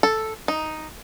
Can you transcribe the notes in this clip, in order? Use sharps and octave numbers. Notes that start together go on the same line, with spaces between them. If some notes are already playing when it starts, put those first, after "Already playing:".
A4
D#4